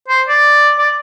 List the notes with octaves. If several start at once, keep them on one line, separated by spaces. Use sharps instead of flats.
C5
D5
D5